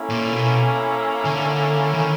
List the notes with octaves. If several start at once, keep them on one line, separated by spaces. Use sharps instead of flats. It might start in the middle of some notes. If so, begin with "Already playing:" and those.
Already playing: A#3 C#4 E4 A4
A#2
B2
D3
D#3